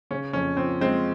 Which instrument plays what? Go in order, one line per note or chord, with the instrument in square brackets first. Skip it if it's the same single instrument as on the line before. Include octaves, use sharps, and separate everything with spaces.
[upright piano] C#3 C#4
F2 C#4
F3 C4
G#3 C4